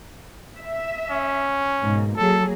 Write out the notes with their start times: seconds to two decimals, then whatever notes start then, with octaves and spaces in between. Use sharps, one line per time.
0.57 E5
1.10 C#4
1.83 G#2 B2 A#3
2.17 F#3 A#3 G#4 A4